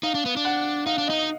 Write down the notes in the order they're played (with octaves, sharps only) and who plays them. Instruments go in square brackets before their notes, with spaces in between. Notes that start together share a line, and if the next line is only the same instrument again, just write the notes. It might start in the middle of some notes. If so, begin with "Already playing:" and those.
[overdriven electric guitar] D#4 [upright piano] F5
[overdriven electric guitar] D4
B3
D4
[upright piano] F#5
[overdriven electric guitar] D#4 [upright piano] F5
[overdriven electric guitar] D4
[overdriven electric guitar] D#4 [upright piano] D#5